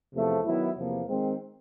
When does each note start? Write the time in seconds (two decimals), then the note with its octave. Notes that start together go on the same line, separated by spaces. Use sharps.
0.13 E2 C3 F3 A3
0.44 D#3 F#3 B3 E4
0.76 E2 C3 F3 A#3
1.08 D#3 G#3 C4